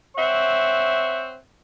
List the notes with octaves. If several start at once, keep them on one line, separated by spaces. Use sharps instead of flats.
C4 C#5 E5 F#5